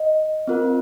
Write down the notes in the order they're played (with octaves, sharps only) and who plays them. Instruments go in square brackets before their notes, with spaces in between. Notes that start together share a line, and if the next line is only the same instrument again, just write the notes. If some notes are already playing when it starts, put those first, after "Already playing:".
Already playing: [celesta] D#5
[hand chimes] C4 F4 A#4